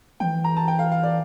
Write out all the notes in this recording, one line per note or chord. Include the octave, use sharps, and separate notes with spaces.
E3 G5
A#5
A5
G5
F5
F5
D5